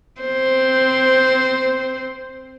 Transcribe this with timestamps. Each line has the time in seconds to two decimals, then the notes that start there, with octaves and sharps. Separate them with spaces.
0.21 C4 C5